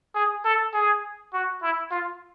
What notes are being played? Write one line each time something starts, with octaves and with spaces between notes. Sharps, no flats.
G#4
A4
G#4
F#4
E4
F4